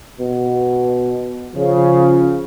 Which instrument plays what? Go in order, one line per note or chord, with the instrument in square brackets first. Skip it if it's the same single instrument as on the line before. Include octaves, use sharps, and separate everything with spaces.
[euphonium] B2
[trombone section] C#3 [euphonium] F3